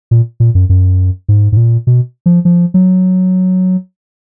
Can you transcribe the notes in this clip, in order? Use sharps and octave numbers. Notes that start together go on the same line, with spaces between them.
A#2
A#2
F#2
F#2
G#2
G#2
A#2
B2
F3
F3
F#3